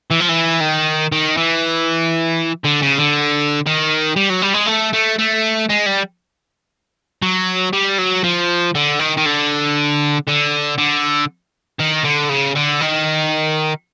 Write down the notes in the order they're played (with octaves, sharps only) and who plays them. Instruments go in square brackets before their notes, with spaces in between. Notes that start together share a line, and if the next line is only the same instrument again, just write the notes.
[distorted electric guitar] E3
F3
E3
D#3
D#3
E3
D3
C#3
D3
D#3
G3
F#3
G3
G#3
A3
A3
A3
G#3
G3
F#3
G3
F#3
F3
D3
D#3
D#3
D3
D3
D3
D#3
D3
C#3
D3
D#3